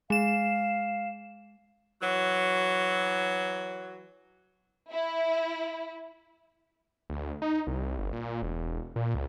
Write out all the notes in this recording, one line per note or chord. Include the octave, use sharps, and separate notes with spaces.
G#3 F5 E7
E3 F#3
E4
D2
D#4
C2
G1
A#2
E1
A#2
C#2